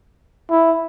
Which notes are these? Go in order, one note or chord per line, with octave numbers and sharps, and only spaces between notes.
E4